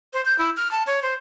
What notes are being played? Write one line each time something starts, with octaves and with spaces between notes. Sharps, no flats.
C5
G6
E4
F6
A5
C#5
C5